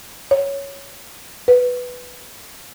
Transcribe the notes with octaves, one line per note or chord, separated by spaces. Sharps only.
C#5
B4